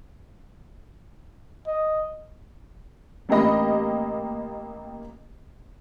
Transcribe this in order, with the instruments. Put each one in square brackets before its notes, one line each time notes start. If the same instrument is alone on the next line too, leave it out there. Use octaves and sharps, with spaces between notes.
[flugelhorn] D#5
[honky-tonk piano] A1 A#3 G4 D#5 B5